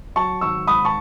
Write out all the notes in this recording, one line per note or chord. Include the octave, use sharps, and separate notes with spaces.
F#3 A5 C#6
G#1 C#6 E6
G#2 B5 D#6
A5 C#6